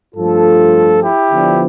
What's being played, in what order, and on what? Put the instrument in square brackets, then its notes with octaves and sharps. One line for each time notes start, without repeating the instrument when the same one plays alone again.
[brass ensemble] G2 F3 A3 F4 A4
E4 G4
D3 F3 B3 D4